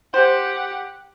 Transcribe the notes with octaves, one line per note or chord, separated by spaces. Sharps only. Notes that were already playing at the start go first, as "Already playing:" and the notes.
G4 C5 F#5